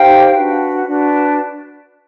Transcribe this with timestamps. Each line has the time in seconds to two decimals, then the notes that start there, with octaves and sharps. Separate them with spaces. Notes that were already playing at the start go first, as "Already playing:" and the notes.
Already playing: D#4 G4 C5 F5 G5
0.34 D4 F#4 B4
0.86 D4 F#4 B4